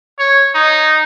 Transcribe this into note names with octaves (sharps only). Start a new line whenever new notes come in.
C#5
D#4